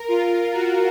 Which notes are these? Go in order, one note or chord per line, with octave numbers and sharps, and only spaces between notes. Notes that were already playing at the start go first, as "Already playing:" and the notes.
Already playing: A#4
F4
F#4